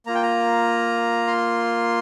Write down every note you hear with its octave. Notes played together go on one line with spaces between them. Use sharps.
A#3 F4 A#5
G5
A#5
C6